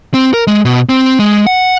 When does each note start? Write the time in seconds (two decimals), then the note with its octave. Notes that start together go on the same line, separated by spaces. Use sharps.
0.14 C4
0.34 A#4
0.47 G#3
0.65 B2
0.89 C4
1.19 G#3
1.47 F#5